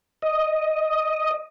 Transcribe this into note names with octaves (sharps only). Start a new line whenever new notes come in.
D#5